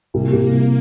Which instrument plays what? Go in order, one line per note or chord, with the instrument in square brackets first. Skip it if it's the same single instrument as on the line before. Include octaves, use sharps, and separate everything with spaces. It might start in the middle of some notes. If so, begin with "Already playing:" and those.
[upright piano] C2 [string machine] A#3
[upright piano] C2
C3